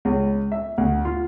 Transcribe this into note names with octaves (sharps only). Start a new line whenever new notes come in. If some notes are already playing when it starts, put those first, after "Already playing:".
C#2
E5
D2
F4